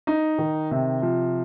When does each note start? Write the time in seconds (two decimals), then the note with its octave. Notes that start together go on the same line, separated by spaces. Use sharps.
0.07 D#4
0.38 D#3
0.71 C3
1.02 F3